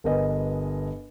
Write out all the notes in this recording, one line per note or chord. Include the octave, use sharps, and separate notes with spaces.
G1 A#4 B4 D#5 G#5